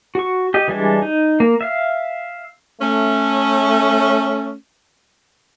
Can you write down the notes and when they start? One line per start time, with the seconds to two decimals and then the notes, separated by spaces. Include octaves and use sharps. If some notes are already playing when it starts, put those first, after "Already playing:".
0.15 F#4 C#6
0.54 G4 D#5
0.68 E3 G3 G#3 D4
1.02 D#4
1.40 A#3
1.61 E5 F5
2.81 A3 C#4